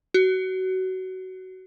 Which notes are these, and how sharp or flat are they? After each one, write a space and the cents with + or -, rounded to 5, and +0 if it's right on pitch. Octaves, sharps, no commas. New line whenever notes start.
F#4 +20